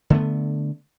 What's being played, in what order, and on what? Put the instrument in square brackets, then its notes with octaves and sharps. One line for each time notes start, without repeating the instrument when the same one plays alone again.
[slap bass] D3 A3 B3